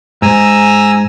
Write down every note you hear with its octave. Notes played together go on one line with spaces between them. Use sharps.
G#2 G#5 A#5 E6